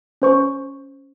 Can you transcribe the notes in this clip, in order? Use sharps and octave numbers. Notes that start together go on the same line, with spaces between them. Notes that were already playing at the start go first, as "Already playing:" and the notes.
C#4 C5 C#6